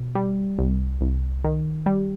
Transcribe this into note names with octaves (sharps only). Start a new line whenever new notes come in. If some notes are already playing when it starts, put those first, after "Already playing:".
Already playing: B2
G3
C2
C2
D#3
G3